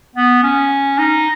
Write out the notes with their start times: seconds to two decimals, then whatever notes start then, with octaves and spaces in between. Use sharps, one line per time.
0.15 B3
0.43 C#4
0.98 D#4